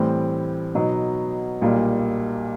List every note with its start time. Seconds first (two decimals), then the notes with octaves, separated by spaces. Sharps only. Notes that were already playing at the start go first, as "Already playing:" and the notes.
Already playing: A2 E3 G3 C4
0.75 B2 F#3 B3 D#4
1.62 B1 A#2 G3 A#3